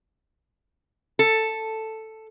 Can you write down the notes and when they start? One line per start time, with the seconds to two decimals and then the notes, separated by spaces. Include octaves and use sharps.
1.19 A4